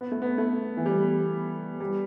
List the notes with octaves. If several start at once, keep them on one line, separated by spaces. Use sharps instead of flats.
B3
A3
B3
A3
E3
G3
G3